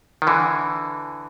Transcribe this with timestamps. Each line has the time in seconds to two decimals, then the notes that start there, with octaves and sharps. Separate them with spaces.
0.22 D#3
0.27 D3 E3